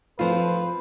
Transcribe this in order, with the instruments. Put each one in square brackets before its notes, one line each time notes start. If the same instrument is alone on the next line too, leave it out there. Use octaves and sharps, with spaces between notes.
[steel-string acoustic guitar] D#3 F3 [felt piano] A3 C4 [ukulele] F4 C5 [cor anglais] B4
[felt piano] C4